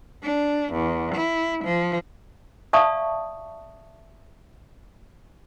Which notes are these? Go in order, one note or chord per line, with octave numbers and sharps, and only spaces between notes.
D4
E2
E4
F3
D5 E5 F5 A5 C#6 D#6